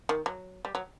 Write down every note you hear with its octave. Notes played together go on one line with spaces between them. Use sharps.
D#3
F#3
G3
F#3